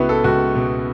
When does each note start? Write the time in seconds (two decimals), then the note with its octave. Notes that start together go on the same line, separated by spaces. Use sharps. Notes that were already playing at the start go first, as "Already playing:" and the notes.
Already playing: C#2 B3 E4 F#4
0.09 A4
0.24 C#2 F#4
0.55 B2